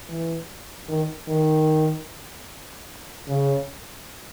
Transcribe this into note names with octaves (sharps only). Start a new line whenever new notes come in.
E3
D#3
D#3
C#3